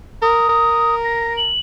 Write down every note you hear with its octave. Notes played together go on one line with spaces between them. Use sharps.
A#4 D#6
A#4
A#6
F#7